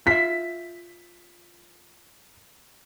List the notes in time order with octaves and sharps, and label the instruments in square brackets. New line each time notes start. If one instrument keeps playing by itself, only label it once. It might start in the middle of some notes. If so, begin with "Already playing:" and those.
[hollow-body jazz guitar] F4 E5 [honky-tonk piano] B6